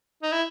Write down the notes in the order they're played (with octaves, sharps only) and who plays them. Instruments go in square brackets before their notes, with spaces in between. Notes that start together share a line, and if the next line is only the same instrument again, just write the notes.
[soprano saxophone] D#4
E4